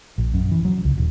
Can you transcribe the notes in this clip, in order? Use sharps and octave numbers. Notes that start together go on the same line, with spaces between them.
A#1
F#2
E3
F#3
C#2
D#1